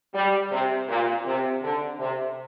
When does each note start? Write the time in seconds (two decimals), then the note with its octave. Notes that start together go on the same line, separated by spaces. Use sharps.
0.14 G3
0.52 C3
0.89 A#2
1.26 C3
1.63 D3
1.99 C3